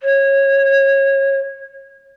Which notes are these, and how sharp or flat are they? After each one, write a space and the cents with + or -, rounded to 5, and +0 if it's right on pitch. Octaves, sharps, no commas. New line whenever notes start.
C#5 -20